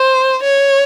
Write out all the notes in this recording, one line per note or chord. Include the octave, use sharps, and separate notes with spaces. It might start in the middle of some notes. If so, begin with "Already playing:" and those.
Already playing: C5
C#5